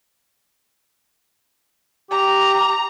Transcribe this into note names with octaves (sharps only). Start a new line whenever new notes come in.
G4 A#5